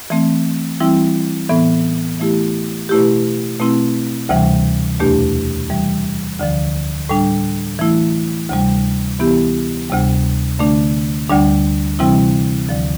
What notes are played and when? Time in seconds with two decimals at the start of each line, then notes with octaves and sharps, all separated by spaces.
0.10 E3 A3 C4
0.80 E3 G3 C4 E4
1.50 A2 E3 B3
2.20 E3 A3 E4 G4
2.89 B2 A3 E4 G4
3.60 B2 A3 C4 E4
4.29 D2 C3 E3 G3
4.99 E2 B2 A3 D4 G4
5.70 C3 E3 G3
6.39 D2 D3 F3
7.09 A2 G3 D4
7.79 E3 A3 E4
8.49 D2 C3 G3
9.20 E3 B3 E4 G4
9.90 D2 C3 G3
10.59 D3 A3 D4
11.29 D2 D3 G3 D4
11.99 C3 E3 G3 C4 E4
12.69 D2 D3 F3